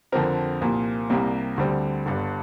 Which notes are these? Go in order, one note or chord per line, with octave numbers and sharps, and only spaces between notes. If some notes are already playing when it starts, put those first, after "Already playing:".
F2 D3 F3 C4 A#4
C2 A#2 F3 A#3
C2 C3 G3 A#3
D2 D3 G3 C4
G1 G2 D3